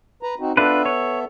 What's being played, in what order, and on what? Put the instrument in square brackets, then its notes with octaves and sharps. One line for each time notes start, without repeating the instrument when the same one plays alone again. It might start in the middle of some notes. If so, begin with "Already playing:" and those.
[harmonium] B4 A#5
C4 D#4 F#4
[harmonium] B3 A4 E5 [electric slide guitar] D4 F4 B4
[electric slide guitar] C#5